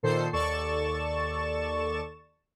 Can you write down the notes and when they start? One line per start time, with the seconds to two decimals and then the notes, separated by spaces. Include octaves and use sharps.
0.03 A#2 D#3 A4 C5 C7
0.33 D#2 A4 D5 C#6 A6 E7